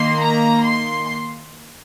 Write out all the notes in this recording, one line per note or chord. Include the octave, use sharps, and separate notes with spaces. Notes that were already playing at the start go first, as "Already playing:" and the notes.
Already playing: D#3 A#3 C6
A#5
C6